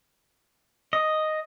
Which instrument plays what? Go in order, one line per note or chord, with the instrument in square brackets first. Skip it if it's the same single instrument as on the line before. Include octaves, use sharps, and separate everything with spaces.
[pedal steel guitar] D#5